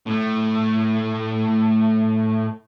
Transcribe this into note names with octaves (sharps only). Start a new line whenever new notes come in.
A2 A3